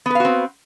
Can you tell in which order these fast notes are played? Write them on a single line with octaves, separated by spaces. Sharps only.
B3 B4 F5 F#4 C4